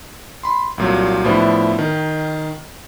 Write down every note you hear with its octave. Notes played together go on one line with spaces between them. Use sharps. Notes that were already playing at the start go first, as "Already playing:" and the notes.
B5 C6
C2 A#2 F#3
A2 F3 B3 D4 E4
D#3